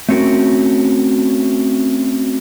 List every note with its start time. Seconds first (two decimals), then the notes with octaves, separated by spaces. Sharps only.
0.09 A3 C4 C#4 F#4 A#4